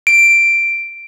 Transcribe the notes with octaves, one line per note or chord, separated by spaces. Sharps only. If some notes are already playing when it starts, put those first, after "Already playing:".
D7